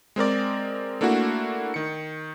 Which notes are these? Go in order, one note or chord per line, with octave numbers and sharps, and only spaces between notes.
G#3 C4 A#4 D5
A3 A#3 D4 E4 F#4
D#3 C#7